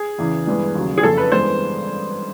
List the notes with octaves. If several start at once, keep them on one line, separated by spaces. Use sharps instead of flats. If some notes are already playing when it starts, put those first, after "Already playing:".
Already playing: G#4
E2 C#3 E3
G2 E3 G#3 B3
D#2 C#3 F#3
G#4
F#1 F2 C#3 A4
B4
G2 E3 G#3 B3 C5